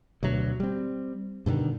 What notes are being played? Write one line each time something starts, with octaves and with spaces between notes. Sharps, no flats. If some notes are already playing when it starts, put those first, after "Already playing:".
D2 B2 F#3
G3 C4
G2 B2 D3 D#3